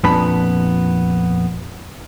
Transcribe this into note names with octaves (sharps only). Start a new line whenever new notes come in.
F2 A#2 B3 D4 A5 B5